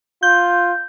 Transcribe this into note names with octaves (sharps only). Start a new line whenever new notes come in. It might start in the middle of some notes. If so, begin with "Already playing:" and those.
F4 G6